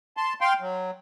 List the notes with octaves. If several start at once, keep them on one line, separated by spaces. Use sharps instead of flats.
A5 C6
F5 G5 C6
F#3